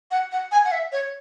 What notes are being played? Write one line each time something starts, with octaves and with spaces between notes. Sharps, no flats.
F#5
F#5
G#5
F#5
E5
C#5